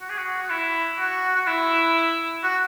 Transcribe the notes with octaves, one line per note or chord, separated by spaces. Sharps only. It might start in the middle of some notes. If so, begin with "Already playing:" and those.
F#4
G#4
F#4
F#4
E4
F#4
F#4
E4
F#4